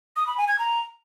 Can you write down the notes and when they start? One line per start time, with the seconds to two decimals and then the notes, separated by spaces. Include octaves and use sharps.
0.16 D#6
0.27 B5
0.37 G#5
0.48 G#6
0.59 A#5